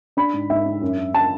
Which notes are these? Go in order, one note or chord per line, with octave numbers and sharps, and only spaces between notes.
D4 B5
G#2
G#2 E5
D4
F#2
F#2
D4 A5